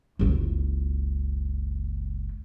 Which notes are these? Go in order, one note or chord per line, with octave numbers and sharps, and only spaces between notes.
F#1 C#2